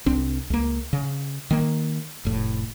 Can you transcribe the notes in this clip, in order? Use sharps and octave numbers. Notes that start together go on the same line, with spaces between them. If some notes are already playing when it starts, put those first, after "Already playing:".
C2 C4 D4
C#2 A#3
C#3
D#3 A#3
F1 A2